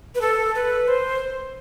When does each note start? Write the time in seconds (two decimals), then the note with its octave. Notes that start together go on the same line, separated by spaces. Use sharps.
0.15 B4
0.21 A4
0.55 B4
0.88 C5